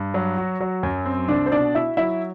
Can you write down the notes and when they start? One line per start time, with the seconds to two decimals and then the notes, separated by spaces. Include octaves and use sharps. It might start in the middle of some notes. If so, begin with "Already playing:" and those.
Already playing: G2
0.14 F#3
0.37 F#4
0.61 F#3
0.83 F#2
1.06 C4
1.29 C2 D4 D5
1.46 C5
1.52 B2 D4 D5
1.75 E4 F#4 E5
1.97 F#3 E4 E5